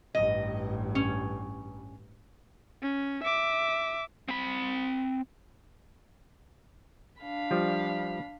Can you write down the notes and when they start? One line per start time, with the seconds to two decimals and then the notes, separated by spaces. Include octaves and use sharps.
0.15 A1 G2 D#5
0.95 C#4
2.82 C#4
3.23 E5 D6
4.28 C4 B5
7.22 D4 F5 B5
7.51 F3 G3